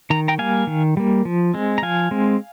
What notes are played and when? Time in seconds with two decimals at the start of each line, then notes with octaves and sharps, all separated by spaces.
0.10 D#3 A#5
0.28 G5 A#5
0.38 G3 A#3 F5 G#5
0.67 D#3
0.97 G3 A#3
1.25 F3
1.54 G#3 C4
1.78 A#5
1.82 F3 F5 G#5
2.11 G#3 C4